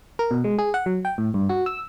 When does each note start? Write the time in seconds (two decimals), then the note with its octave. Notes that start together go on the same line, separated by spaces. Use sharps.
0.19 A#4
0.31 B2
0.44 G#3
0.59 G#4
0.74 F#5
0.86 F#3
1.05 G5
1.18 A2
1.34 G2
1.49 F#4
1.66 E6